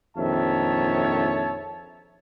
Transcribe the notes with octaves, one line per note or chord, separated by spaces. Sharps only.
A#1 F2 D#3 C#5 E5 A5